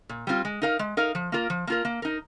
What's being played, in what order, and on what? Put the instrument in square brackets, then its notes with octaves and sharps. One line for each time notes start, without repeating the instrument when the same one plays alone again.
[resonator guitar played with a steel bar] A#2
G3 C4 F4
G#3
D#4 A#4 F5
G#3
D#4 A#4 F5
F3
A#3 F4 A#4
F3
A#3 F4 A#4
A#3
D#4 A#4